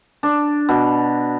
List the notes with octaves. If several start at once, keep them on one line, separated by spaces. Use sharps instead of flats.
D4
B2